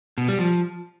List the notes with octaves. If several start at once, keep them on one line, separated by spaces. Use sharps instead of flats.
B2
G3
F3